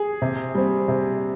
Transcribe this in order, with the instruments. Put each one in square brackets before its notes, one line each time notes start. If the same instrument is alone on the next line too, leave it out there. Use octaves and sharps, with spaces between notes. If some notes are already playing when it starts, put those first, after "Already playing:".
Already playing: [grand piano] G#4
[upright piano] C3
G3 C4
C3